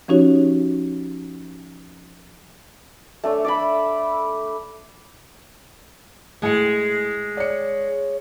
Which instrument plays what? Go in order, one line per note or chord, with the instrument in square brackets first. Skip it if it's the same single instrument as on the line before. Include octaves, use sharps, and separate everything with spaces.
[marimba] F3 C#4 D#4 F#4 G4 C#5
[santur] A3 D4 C#5 D5
D5 E5 B5
[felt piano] A2 G#4 C#7 [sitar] G#3
[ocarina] C#5 [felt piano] D5 C#7